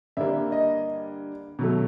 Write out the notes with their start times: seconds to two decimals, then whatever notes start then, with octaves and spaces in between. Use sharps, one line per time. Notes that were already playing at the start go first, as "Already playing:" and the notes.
0.17 G2 D3 G3 A#3 E5
0.52 D#5
1.59 B2 F#3 A3